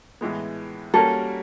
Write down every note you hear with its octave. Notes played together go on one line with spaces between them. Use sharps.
A2 E3 G#3 B3
G3 A#3 C#4 F#4 A4 A#4